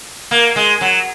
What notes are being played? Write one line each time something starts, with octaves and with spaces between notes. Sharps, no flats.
A#3
G#3
F#3